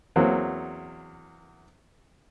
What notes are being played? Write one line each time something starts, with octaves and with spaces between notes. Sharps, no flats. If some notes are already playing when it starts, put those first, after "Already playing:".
E2 F#3 A#3 C4